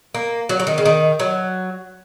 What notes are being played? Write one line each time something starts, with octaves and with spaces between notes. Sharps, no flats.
A#3
F#3
F#3
D#3
C#3
D#3
F#3